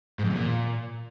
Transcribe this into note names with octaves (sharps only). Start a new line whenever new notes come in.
G#2
F2
E2
A#2